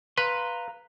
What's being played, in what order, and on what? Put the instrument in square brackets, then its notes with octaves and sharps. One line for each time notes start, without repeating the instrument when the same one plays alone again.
[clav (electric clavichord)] B4 [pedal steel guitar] F5 A#5 C6